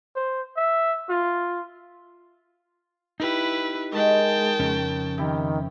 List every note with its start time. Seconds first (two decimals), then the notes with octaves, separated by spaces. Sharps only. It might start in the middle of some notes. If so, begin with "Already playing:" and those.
0.16 C5
0.57 E5
1.10 F4
3.20 D#4 E4 G4 B4
3.92 D#3 G#3 G5 A5
4.60 F2 C#3 C#4
5.18 C3 D#3 E4 G4